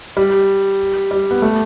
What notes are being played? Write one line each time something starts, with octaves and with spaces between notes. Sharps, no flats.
G3
G3
B3
A3